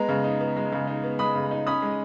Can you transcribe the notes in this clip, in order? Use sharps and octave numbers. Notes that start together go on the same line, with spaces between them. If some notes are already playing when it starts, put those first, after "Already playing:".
Already playing: G#3 B3 A#5
C#3
D#4
B3
G#3
C#3
D#4
B3
G#3 B5 D#6
C#3
D#4
C#4 B5 D#6
G#3